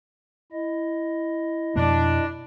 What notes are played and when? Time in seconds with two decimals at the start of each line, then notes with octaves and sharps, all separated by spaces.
0.53 E4 D#5
1.76 F2 B2 A#3 D4